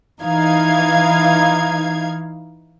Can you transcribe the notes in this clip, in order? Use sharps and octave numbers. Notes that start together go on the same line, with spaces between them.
E3 D#4 F5 G#6